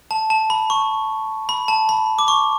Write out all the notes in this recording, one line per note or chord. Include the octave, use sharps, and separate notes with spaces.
A5
A5
B5
C#6
B5
A5
B5
D6
C#6